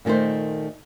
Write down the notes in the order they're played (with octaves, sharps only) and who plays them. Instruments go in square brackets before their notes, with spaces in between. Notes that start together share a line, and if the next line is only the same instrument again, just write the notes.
[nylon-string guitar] A#2 D#3 A3 D#4 C5